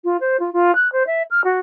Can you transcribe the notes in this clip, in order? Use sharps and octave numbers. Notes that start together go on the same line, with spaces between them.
F4
C5
F4
F4
F#6
C5
E5
F6
F#4